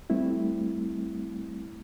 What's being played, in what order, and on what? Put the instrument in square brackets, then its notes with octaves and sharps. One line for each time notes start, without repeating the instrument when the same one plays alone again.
[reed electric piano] G3 A3 C4 E4